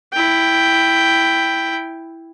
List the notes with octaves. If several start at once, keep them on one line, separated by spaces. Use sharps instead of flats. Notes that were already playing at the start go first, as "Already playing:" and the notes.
E4 G5